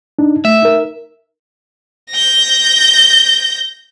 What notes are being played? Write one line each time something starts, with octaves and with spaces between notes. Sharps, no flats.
D4 D#4
A3 E5
D#4 A#4
G6 A#6